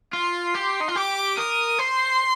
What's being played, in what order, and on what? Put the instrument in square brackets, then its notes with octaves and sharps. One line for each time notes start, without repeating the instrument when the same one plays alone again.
[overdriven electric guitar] F4 [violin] C6
[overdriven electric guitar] G4
D#4
F4
[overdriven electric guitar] G4 [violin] D6
[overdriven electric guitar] A#4 [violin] D#6
[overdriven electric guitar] C5 [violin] C6